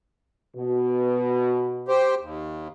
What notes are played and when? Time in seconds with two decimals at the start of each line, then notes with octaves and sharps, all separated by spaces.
0.56 B2
1.88 G4 C5
2.21 D#2